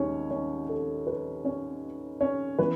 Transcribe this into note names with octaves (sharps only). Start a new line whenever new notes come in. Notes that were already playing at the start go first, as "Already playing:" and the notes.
Already playing: D#2 D#3 G#3 C#4 C#5
C#4 C#5
A4
B4
C#4 C#5
C#4 C#5
E3 B3 B4